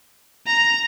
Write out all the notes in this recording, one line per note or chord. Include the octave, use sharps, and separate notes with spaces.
A#5